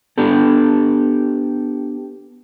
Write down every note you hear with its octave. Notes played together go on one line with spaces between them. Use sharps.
B3 D4 G4 A4